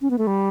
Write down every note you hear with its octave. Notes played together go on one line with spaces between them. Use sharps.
C#4
B3
A3
G3